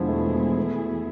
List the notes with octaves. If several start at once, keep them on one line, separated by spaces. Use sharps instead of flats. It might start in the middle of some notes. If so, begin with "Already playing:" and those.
Already playing: E2 B2 D3 F3 G#3 B3 E4 G#4
A3
G#3
F3
G#3
A3